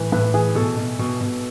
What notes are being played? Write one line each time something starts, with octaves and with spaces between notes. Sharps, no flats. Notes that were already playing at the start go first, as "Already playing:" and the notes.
Already playing: A2 E3 B4
A2 B4
E3 G#4
B2 A4
B2
B2
B2